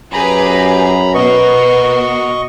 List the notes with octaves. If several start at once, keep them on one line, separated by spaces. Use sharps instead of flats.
F#2 G4 G#4 B4 A#5 B5
B2 F#4 A#4 B4 D#5 C#6